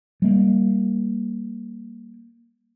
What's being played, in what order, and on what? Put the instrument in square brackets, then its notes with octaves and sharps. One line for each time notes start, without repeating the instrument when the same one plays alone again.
[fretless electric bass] G3 A#3